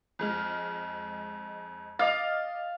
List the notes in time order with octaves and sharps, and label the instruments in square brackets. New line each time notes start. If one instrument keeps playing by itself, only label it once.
[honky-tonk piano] F2 G#3 F6
[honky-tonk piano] D#5 D6 A6 [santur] F5